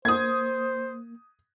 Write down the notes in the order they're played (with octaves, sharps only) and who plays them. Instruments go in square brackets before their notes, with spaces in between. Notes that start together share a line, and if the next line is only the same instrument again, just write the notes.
[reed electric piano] A#3 [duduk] C5 [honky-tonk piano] D#6 G#6